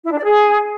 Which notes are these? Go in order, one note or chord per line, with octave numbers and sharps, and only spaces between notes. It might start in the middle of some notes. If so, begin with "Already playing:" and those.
E4
D4
D5
G#4